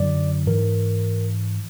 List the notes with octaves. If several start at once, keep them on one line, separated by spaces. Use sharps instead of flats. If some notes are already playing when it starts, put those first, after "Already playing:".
Already playing: F#2 D3 F#3 D5
G#2 E3 A#4